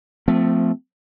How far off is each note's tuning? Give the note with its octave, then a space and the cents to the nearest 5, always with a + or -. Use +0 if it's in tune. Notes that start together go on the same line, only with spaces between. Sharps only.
F3 +0 A3 +10 C4 -25